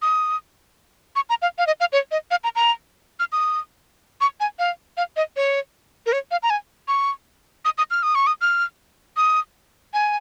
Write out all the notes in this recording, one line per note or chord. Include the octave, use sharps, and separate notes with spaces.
D#6
C#6
A#5
F5
F5
D#5
F5
C#5
D#5
F5
A#5
A#5
F6
D#6
C#6
G#5
F5
F5
D#5
C#5
A#4
C#5
F5
A#5
G#5
C#6
D#6
D#6
F6
D#6
C#6
D#6
F6
D#6
G#5